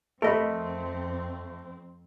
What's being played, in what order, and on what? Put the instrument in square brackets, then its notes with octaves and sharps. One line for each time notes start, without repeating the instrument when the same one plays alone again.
[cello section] F2 C4 [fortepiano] A3 [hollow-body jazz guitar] A#4 D#5 B5